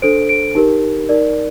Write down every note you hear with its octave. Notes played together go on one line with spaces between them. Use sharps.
D4 A4 C5 D7
D7
D#4 G4 A#4
D#4 A#4 D5